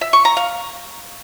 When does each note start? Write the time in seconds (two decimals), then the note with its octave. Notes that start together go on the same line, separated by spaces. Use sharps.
0.01 E5
0.13 C#6
0.25 A#5
0.37 F5